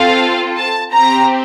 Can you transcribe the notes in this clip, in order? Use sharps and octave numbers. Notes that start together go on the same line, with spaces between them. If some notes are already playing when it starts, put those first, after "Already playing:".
Already playing: C4 F4 A4 F5
A5
C4 G4 A#5